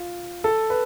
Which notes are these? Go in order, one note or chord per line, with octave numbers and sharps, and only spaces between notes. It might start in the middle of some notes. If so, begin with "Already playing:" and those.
Already playing: F4
A4
B4